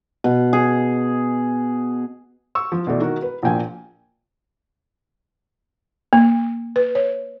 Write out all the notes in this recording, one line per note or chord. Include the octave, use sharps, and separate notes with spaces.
B2
G#4
C#6 E6
F3
B2 E3 A3 D5
D#3 A#3 F#4 A#4
B4
A#1 A#2 G5 G#5
A#3
B4
C#5